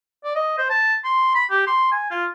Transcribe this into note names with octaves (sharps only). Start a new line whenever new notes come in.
D5
D#5
C5
A5
C6
B5
G4
C6
G#5
F4